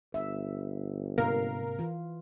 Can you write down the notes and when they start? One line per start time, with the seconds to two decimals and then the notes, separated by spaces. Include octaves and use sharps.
0.14 G1 E5
1.18 G#2 C3 A#3 A#4 F5
1.79 E3 F4